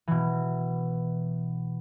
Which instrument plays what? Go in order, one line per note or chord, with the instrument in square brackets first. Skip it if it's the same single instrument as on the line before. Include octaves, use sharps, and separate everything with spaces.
[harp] B2 E3